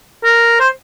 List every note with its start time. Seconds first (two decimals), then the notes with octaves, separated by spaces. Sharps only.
0.24 A#4
0.60 C5